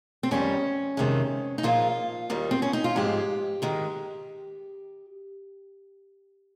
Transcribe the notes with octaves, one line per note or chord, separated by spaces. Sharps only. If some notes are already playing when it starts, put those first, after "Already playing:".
C4
F2 D#3 G3 C#4
F2 C3 D#3 G#3
D#4
A#2 F3 G#3 F4
D#2 D#3 G3
C4
C#4
D#4
F4
G#2 F3 G#3 G4
G#2 D#3 G#3